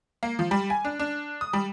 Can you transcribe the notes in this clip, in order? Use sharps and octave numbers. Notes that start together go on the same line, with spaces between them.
A#3
F3
G3
G#5
D4
D4
D#6
G3